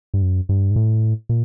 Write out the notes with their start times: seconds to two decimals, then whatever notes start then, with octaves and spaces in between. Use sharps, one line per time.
0.14 G2
0.22 F#2
0.49 G2
0.71 G#2
0.76 A2
1.29 A#2